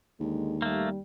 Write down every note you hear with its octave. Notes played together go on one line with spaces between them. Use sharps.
D#2 D3 D#3 G#3
G3 A3 A#3